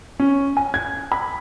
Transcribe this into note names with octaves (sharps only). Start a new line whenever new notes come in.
C#4
G#5
G#6
B5